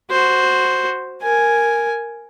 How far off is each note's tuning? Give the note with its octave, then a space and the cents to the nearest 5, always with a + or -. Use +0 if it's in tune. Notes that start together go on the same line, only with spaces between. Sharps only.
F#4 +0 C5 +0
A#4 +0 G#5 +0